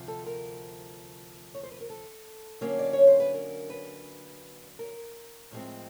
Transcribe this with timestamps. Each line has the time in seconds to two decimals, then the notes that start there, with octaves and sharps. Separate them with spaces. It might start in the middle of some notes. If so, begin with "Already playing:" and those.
Already playing: D2 C3 F3
0.08 A4
0.26 A#4
1.54 C#5
1.63 C5
1.72 B4
1.80 A#4
1.90 A4
2.61 D3 F#3 A#3 C#4
2.79 D5
2.93 C#5
3.07 C5
3.20 B4
3.34 A#4
3.70 B4
4.79 A#4
5.51 A2 F3 G#3 C4